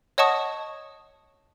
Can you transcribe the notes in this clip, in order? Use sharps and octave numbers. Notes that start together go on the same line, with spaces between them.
C#5 D#5 F#5 A5 C#6 D#6